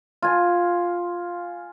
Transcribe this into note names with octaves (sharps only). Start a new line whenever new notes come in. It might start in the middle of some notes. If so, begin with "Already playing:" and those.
F4 G#5